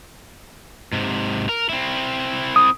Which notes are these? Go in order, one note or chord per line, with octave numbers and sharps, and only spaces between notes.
G#2 C3
A#4
C4 E4
D#6